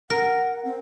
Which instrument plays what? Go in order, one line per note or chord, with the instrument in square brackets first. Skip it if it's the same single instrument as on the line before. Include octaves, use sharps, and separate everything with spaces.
[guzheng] A#4 [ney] F#5
[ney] C4